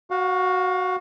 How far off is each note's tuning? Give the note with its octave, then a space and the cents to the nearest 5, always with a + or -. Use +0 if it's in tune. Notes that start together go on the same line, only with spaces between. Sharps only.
F#4 +0 F5 +35